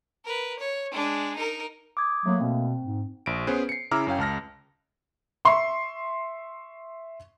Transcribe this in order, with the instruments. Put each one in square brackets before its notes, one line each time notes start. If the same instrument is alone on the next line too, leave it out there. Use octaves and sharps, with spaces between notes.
[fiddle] A#4 B4
C#5
G#3 D4
D#4 A#4
[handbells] D6 D#6 G#6
[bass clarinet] F#3 [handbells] A3 A#3
[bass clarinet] B2 [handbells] C4
[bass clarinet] G#2
[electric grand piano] A#1 D7
B3 C#4 G#4 B4 C5
C7 C#7
C#3 E4 A#5 D6 E6 F6
F#2 C#4 F5 G5
C#2 A5 F6 A#6
[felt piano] E5 C6 C#6